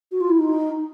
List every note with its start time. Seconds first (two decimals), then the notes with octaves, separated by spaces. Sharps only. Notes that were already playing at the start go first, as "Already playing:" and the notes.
0.12 F#4
0.20 F4
0.29 E4
0.39 D#4